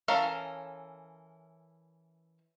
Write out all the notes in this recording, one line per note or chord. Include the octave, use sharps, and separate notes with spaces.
E3 C#4 A4 A#4 F5